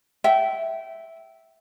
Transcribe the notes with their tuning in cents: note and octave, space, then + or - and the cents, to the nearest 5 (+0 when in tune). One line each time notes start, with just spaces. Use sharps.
E5 -5 G5 -25